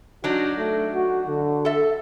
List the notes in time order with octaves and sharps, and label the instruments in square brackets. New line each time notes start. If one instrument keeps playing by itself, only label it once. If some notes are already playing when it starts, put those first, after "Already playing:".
[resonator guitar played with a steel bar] F#3 D4 D#4 [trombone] F#4
[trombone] A3
F#4
D3
[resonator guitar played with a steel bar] A4 E5